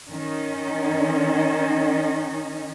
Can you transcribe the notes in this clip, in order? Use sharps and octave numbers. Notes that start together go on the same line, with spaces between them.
D#3 C#4 D#4